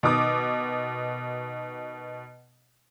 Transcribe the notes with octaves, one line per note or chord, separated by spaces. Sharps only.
B2 D#3 D6 D#6